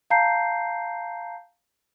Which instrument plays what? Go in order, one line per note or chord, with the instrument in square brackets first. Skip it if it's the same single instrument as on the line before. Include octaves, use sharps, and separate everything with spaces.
[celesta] F5 A5 A#5 G6 C7